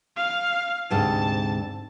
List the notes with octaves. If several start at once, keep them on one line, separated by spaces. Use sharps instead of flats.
F5
D2 G#2 C3 A5